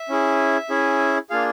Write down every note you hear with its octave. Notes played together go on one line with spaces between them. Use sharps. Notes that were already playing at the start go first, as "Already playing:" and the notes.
Already playing: E5
C#4 E4 G#4
C#4 E4 G#4
A#3 D4 F4 G#4 F5